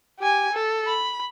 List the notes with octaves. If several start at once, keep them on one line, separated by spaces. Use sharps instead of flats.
G4 G#5
A4
B5